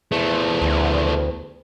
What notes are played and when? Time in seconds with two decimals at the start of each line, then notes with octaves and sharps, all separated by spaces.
0.12 E2 F3 A3
0.62 D2